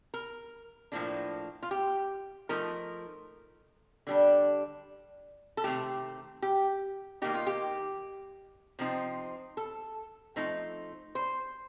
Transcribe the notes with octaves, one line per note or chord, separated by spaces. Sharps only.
A#4
A2 F3 A#3 D4
F4
G4
F3 A3 D#4 A#4
D3 G3 D4
A4
C3 D#3 A3 G4
G4
D#3 A#3 D#4 G4
F4
G4
C3 F3 C4 D#4
A4
F3 A3 C4 D#4
C5